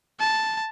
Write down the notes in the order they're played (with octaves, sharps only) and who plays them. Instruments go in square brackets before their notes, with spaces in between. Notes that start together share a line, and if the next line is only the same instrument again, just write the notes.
[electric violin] A5